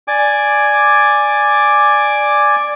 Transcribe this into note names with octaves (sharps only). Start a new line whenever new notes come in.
D5 G#5 D6